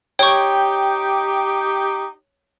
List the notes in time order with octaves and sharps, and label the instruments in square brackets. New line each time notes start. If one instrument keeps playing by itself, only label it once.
[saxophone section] D#4 G4 [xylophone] C#5 C#6 [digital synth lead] G5